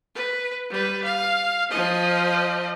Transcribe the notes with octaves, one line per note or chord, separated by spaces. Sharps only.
B4
G3 B4
F5
F3 D#5